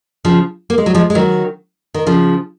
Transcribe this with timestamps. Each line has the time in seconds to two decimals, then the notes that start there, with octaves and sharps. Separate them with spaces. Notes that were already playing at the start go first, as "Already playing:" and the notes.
0.25 C#3 F3
0.70 A#3
0.78 G#3
0.86 F#3
0.95 F3 G#3
1.10 G#3
1.15 D#3 F#3
1.94 D#3
2.06 C#3 F3